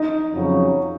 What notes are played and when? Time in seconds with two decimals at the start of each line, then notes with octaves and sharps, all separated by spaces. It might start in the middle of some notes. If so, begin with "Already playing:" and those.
Already playing: D#4
0.32 F2 C#3 F#3